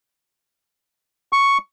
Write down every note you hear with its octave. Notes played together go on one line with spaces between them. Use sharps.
C#6